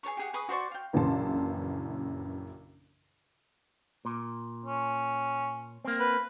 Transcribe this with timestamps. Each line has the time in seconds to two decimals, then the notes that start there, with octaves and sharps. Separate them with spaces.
0.03 G#4 A4 C#5 C#6
0.17 G4 G#4 F#5
0.33 G#4 B4 C#6 D#6
0.49 F#4 C5 D5 C#6
0.71 F5 G5
0.93 A#1 F#2 C#3 E3 A5 C6
4.05 A#2
4.65 C#4
5.85 A#3 C4
6.00 B4